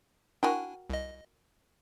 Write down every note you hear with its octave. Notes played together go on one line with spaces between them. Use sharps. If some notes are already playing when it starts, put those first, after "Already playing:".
D4 E4 F#4 A#4 G5 G#5
C2 D#5